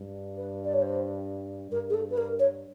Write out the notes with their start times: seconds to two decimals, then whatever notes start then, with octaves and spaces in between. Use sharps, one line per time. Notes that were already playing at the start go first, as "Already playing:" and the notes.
Already playing: G2
0.37 B4
0.65 D5
0.73 C#5
0.82 C5
1.72 G2 A#4
1.90 G#4
1.94 A4
2.10 B4
2.18 A#4
2.39 C#5